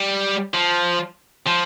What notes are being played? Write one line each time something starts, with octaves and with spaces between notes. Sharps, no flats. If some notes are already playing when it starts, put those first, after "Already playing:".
Already playing: G3
F3
F3